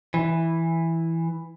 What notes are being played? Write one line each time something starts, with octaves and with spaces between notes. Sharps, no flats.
E3